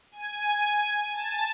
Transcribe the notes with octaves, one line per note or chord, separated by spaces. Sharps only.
G#5
A5